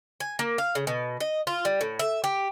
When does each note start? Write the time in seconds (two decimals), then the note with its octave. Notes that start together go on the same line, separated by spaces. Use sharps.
0.20 G#5
0.39 A#3
0.58 F5
0.75 C#3
0.87 B2
1.20 D#5
1.47 F4
1.65 G3
1.81 A2
1.99 E5
2.24 G4